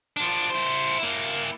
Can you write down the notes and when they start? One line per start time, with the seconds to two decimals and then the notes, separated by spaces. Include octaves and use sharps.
0.17 F3 D4
0.50 E4 C5
0.99 A#3 E4